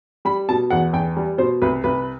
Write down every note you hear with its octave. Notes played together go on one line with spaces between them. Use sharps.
G3 B5
B2 A5
E2 F#5
E2 G5
G3
B2 C5
C2 B4
C2 B4